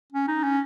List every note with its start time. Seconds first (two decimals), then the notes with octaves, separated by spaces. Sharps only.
0.13 C#4
0.28 D#4
0.43 C#4